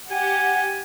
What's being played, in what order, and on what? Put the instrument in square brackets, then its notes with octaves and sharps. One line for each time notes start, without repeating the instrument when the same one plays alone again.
[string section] G4 F#5 [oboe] G#5